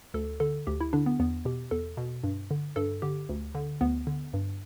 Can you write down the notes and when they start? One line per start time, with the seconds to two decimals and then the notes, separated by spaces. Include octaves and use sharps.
0.14 D2 A4
0.40 D3 A4
0.67 D2 G4
0.81 E4
0.93 D3 D4
1.06 B3
1.20 E2 B3
1.45 B2 G4
1.71 E2 A4
1.97 B2
2.24 G2
2.51 D3
2.76 G2 A4
3.02 D3 G4
3.29 D2
3.55 D3
3.81 D2 B3
4.07 D3
4.34 G2